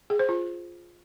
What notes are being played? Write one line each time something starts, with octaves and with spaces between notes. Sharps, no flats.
G#4
C5
F4